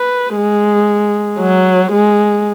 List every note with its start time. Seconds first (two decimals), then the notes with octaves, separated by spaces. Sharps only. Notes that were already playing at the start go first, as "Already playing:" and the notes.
Already playing: B4
0.36 G#3
1.40 F#3
1.92 G#3